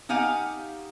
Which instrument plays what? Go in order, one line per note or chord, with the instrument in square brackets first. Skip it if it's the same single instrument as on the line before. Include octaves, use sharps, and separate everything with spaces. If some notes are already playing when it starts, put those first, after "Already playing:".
[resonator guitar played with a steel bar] D#4 G4 F5 F#5 G#5